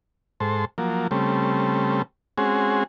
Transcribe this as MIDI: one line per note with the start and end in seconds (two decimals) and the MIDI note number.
0.40 0.65 44
0.40 0.65 69
0.40 0.65 72
0.78 1.07 53
0.78 1.07 54
0.78 1.07 58
1.11 2.02 49
1.11 2.02 55
1.11 2.02 57
1.11 2.02 60
2.38 2.84 56
2.38 2.84 60
2.38 2.84 61
2.38 2.84 66
2.38 2.84 68